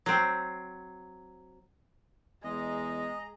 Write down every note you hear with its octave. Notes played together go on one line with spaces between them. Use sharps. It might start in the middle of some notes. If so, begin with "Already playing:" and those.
F#3 C4
E2 G#3 G#4 D#5 A#5